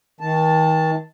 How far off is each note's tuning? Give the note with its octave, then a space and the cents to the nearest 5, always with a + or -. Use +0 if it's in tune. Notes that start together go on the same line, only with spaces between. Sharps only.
D#3 +35 A5 +0